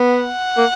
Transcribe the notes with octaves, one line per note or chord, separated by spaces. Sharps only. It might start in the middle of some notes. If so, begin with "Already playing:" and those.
Already playing: B3
F#5
A#3